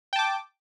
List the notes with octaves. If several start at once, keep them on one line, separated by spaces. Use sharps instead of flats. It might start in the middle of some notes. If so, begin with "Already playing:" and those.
G5 A5 D6